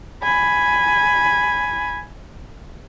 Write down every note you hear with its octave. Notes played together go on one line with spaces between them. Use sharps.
G#5 B5